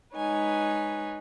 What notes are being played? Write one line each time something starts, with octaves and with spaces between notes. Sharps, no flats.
G#3 D#4 B4 C#5 G#5